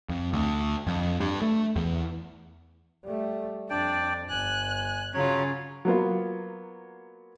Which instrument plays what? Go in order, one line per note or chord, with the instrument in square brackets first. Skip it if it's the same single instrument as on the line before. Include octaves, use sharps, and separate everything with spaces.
[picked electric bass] F2
D2
F2
G2
A3
E2
[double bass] G3 A3
[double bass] F2 [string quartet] D4 [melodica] D5 G5 A5
[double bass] G1 [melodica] G#5 [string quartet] F#6
[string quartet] C#3 C#4 F4 [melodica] F#3 C#5
[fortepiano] F#3 A#3 B3 F4